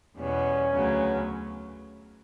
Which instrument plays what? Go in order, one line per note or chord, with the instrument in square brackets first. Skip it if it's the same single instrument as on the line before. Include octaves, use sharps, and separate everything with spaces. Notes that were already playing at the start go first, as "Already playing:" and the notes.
[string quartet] E2 B2 G3 B3 [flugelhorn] C#4
[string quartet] D2 C#3 F#3 B3